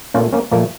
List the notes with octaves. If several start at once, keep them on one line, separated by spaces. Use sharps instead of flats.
A#2 A3 C#4 F4
A#3 C#4
A#2 F3 A3 A#3